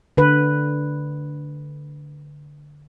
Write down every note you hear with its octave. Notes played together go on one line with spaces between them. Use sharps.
D3 B4